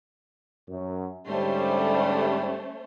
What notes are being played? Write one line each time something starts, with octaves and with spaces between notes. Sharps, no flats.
F#2
G#2 D3 G3 A3 C#4 C5